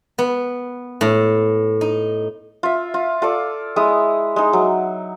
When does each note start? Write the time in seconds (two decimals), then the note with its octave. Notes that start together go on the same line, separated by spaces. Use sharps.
0.18 B3
1.01 A2
1.81 D#4
2.63 F4 E5
2.94 F4
3.22 F4 A4 D5
3.76 G#3 E4 D#6
4.36 G#3 D#4
4.53 F#3